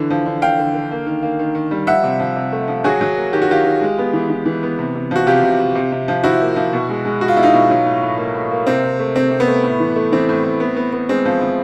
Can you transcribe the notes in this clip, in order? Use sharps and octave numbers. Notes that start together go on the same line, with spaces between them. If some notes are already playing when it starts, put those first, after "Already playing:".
Already playing: D3 E3
F3
D3
D3 F5 G5
D3
D3
A#3
D#3
A#3
D#3
D#3
G3
F3 E5 F#5
C3
F3
C3
A3
F3
F#3 F#4 G#4
F#3
A#3
D#3 G4
F#4
D#3 F4 G4
D#3
G#3
B3
E3
E3
E3
B3
C3
C3
F3 F#4
C3 F4 G4
C3
C3
C3
C3
F3
F3 E4 F#4
A#3
F3
B2
G#3
G#3
G#3 F#4
F4
B2 E4
D#4 F4
B2
F#3
A2
A2
A#3
A2
A#3
C3 C4
C3
A3
C3 C4
C3
B3
A3
A2
E3
A3
E3 C4
A2
A2
B3
B3
B3
G#3 C4
F3
F3